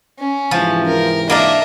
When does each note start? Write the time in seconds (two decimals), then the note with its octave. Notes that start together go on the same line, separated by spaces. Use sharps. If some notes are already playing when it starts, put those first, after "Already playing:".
0.18 C#4
0.51 G#2 C3 E3 F3
0.87 A#4
1.30 A#3 D4 A#4 D#5 E5